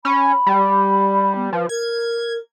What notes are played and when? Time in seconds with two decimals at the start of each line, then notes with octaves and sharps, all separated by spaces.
0.05 C#4 B5
0.46 G3
1.36 B3
1.53 F3 B4
1.69 A#4 G#6